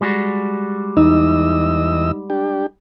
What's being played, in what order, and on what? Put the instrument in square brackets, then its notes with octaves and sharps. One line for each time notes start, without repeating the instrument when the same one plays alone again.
[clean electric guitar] G3 G#3 F#4
[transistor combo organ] E2 D#5 E6 [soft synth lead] D#4
[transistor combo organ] D4 G4